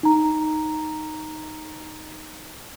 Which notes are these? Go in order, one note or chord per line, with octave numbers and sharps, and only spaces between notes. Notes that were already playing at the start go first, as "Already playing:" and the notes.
D#4 A#5